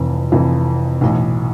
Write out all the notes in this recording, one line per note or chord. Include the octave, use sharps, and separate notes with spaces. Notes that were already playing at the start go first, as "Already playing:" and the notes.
Already playing: F1 F2 E3
F1 F2 E3
B1 A2 E3